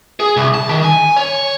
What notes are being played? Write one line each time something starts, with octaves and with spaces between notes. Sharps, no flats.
G#4
C2
A5
D#3
G#5
C#5